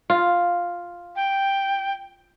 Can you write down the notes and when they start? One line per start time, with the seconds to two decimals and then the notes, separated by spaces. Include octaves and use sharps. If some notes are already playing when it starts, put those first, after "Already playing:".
0.10 F4
1.16 G5